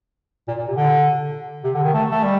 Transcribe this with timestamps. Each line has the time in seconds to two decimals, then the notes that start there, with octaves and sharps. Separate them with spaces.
0.48 A#2
0.58 A#2
0.67 C3
0.77 D3
1.64 C3
1.74 D3
1.84 D#3
1.94 A3
2.11 A3
2.23 G3